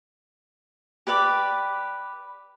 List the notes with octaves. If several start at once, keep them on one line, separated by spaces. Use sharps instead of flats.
G4 B4 D5 D6